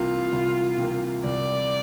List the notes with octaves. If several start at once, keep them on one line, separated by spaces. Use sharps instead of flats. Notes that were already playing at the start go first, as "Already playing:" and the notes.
Already playing: C2 C3 E3 A#3 F4
C2
C3 E3 A#3
C2 D5